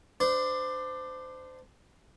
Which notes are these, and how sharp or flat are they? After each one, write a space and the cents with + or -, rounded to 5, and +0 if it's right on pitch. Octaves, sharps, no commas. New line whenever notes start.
D4 +15 C5 -25